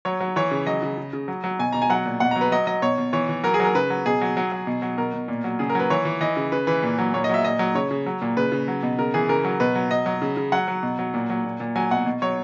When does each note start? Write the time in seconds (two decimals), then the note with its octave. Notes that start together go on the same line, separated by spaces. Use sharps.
0.05 F#3 C#5
0.20 F#3
0.36 E3 C#5
0.51 C#3
0.66 F#3 D#5
0.82 C#3
0.98 C#3
1.13 C#3
1.28 F#3
1.44 F#3
1.59 B2 G#5
1.73 B2 A#5
1.82 G#5
1.90 F#3 F#5
2.06 A#2
2.20 B2 F#5
2.31 A#5
2.36 F#3
2.41 B4
2.52 F#3 D#5
2.67 F#3 D#5
2.82 B2 C#5
2.98 B2
3.13 E3 C#5
3.29 E3
3.44 F#3 A#4
3.54 G#4
3.60 F#3 A#4
3.75 C#3 B4
3.90 F#3
4.05 B2 G#4
4.21 F#3
4.37 F#3
4.52 F#3
4.67 B2
4.82 F#3
4.98 B2 A#4
5.13 B2
5.28 A#2
5.44 F#3
5.59 C#3 G#4
5.70 A#4
5.75 F#3 B4
5.90 E3 C#5
6.05 E3
6.21 E3 D#5
6.37 C#3
6.52 C#3 B4
6.67 E3 B4
6.83 A#2
6.98 F#3
7.14 A#2 C#5
7.24 D#5
7.29 F#3 E5
7.44 A#2 D#5
7.59 F#3
7.75 C#3 C#5
7.91 C#3
8.06 F#3
8.22 A#2
8.37 C#3 B4
8.52 C#3
8.68 F#3
8.83 B2
8.99 C#3 A#4
9.14 E3 G#4
9.29 C#3 A#4
9.45 F#3
9.60 B2 B4
9.75 F#3
9.91 B2 D#5
10.06 F#3
10.22 C#3
10.37 C#3
10.52 F#3 F#5
10.68 F#3
10.83 B2
10.99 F#3
11.14 A#2
11.30 F#3
11.45 A#2
11.60 A#2
11.76 F#3 G#5
11.91 B2 F#5
12.06 B2
12.22 F#3 C#5